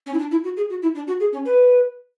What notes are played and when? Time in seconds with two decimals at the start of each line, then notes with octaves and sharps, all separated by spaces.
0.06 C#4
0.14 E4
0.19 D4
0.31 E4
0.44 F#4
0.57 G#4
0.70 F#4
0.82 E4
0.95 D4
1.08 F#4
1.20 G#4
1.33 C#4
1.45 B4